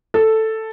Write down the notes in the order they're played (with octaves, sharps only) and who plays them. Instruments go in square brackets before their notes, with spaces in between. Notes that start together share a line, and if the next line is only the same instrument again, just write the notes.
[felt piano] A4